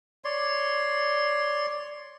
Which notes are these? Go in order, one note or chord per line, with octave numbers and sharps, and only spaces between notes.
C#5 D5 C6